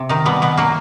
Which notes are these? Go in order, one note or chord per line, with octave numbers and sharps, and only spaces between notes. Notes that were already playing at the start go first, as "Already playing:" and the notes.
Already playing: C3
D#3 D#4
B2 G3 B3
B2 B3
F#3 A#3